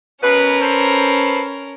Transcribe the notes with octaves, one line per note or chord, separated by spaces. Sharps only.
B2 C#4 A#4 B4
A4 B4 C5